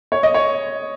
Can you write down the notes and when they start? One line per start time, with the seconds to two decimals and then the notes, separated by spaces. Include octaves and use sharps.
0.12 C#5
0.23 D#5
0.34 C#5